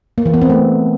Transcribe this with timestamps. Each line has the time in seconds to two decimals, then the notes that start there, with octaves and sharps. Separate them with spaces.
0.18 A#3
0.26 E3
0.34 B3
0.42 C4
0.50 A3